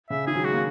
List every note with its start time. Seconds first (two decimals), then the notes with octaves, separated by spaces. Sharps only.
0.10 C#3 E5
0.27 D#3 G#4
0.35 F#3
0.45 G#3 F#4
0.53 A#3